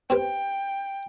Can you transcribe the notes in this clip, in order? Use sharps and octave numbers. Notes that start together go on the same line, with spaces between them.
C4 G4 B4 G5